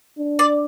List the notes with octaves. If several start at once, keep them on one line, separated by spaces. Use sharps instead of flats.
D4
D5